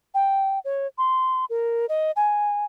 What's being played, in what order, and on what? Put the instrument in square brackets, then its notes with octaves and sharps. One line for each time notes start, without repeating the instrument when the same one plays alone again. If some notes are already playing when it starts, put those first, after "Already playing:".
[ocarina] G5
C#5
C6
A#4
D#5
G#5